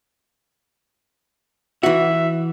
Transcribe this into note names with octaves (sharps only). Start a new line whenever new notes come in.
E3 F#4 E5